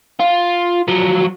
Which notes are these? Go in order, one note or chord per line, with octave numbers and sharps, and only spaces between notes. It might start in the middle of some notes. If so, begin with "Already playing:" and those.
F4
F3 F#3